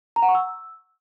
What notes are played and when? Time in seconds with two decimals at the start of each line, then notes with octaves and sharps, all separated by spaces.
0.16 A#5
0.22 F#5
0.29 C#6
0.35 E6